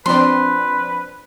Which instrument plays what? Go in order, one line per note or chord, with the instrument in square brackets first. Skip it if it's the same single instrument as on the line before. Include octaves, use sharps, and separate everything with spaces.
[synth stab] F3 C4 D4 [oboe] B4 [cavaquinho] C6